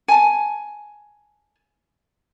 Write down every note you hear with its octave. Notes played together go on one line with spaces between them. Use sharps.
G#5 A5